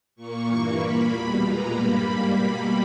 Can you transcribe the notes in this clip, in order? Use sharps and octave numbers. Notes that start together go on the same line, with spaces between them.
A#2 A#3 C#6
G2 E3 A#3
A#2 A#3 B5
E2 B2 G3
A#2 G#3 B3 A#5
G2 G3 A#3 B5
G#2 G3 A#3
B2 G3 A#3